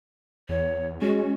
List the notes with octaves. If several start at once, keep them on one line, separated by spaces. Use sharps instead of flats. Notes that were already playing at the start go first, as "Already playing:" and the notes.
E2 C#5
G#3 C#4 F#4